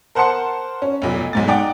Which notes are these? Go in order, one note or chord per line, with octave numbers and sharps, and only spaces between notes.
A#4 C5 F#5 A5 C6 C#7
C#4
F1 B1 A#2
B1 G#2 A6
D#4 D5 F#5 G5 D6